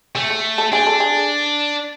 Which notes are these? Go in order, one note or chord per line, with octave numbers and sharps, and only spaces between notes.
A3 G#4
A4
A4
D4 G#4
A4
G#4